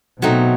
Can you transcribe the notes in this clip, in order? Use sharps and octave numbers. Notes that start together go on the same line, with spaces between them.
B2 F#3 A3 C4 D#4